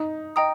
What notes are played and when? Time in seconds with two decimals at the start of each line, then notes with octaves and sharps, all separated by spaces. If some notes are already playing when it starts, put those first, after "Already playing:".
Already playing: D#4
0.36 D#5 G5 A#5 D#6